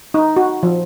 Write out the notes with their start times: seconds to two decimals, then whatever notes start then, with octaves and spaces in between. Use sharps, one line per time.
0.14 D#4
0.36 F#4
0.63 F3